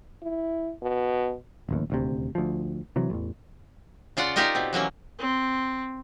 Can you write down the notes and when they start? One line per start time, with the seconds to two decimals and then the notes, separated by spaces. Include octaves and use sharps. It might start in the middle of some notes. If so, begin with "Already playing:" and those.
0.22 E4
0.82 B2
1.69 D1 A1 D#2
1.90 D#1 D2 C3
2.35 D2 F3
2.96 C3 E3 F#3
3.10 A1 E2
4.17 C#3 F4 D5 F#5
4.36 D#4 F4 G4 A#4 D5 D#5
4.55 B2 C4
4.73 E3 F#3 A#3 C#4
5.19 C4